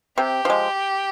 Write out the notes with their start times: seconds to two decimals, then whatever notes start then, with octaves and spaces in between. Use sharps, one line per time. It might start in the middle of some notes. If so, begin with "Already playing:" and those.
0.18 C3 G4
0.45 F3 G#3